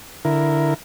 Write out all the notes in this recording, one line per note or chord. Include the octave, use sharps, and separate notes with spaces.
D3 E4 A#4